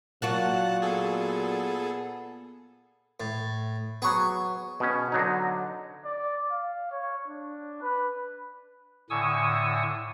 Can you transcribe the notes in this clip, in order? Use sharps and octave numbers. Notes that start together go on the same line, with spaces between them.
A#2 F#3 A#3 F#4 F#5 A5 F#6
B3 G#4 A4
A2
F#3 B3 G#4 C#6
B2 C#4
D3 F#3 D#4
D5
F5
C#5
D4
B4
A2 D3 G#5 C#6 D#6 E6